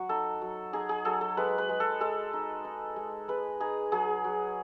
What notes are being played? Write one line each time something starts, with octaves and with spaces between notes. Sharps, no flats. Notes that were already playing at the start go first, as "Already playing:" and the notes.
Already playing: F#3 F#4
D#4 A4
F#3
D#4 G#4
G#4
F#3 A4
A4
G#3 B4
B4
G#3
A4
G#3 A4
D#4
D#4
G#3
G#3 B4
D#4 G#4
F#3 G#4
F#3